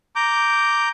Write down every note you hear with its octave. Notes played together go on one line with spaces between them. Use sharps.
A#5 D6 G6